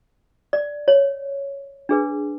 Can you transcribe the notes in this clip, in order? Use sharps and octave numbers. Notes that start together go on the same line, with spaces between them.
D5
C#5
D4 G#4 B4